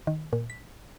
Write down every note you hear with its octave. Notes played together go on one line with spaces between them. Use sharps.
D#3
A#2
B6